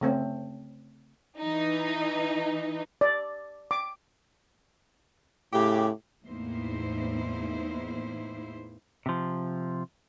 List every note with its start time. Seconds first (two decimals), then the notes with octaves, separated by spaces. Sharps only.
0.01 C#3 A3 C4 C#4
1.39 E3 D#4
3.01 D5
3.71 D6
5.53 A2 C#3 G4
6.25 E2 A2 A#3 D#4 E4 C5
9.06 C3 F3